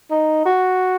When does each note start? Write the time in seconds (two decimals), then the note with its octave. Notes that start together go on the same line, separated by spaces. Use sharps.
0.11 D#4
0.46 F#4